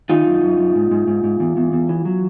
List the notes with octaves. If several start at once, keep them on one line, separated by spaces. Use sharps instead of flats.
D#3 D#4 F4
F#2
F#2
F#2
G#2
G#2
G#2
G#2
E2
E2
E2
E3
F#3